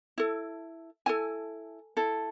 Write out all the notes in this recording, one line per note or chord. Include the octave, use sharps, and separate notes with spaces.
E4 A4
E4 A4 G#5
E4 A4